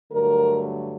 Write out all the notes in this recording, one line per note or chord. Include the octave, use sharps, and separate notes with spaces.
G2 D3 F#3 A3 A#4